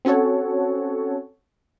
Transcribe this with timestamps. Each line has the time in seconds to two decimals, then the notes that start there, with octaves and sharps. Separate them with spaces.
0.05 C4 C#4 F#4 A4 C#5